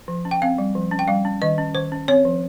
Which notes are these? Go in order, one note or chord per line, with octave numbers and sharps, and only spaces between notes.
F3
C#4
G5
C4 F5
G3
F3
C#4
G5
G3 F5
C#4
D#3 D#5
C#4
D#3 C5
C#4
C4 C#5
F3